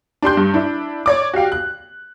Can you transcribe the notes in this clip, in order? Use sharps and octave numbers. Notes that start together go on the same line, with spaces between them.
D4 G4 C6 G6
G2
D4 E4
C#5 D5 D6
F#4 G4 F5 G5
F#6